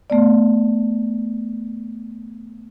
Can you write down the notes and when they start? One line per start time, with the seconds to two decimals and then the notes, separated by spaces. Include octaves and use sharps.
0.10 A3 B3 D5